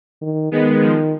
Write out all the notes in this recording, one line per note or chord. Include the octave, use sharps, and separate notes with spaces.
D#3
D#3 G#3 B3
F3 G#3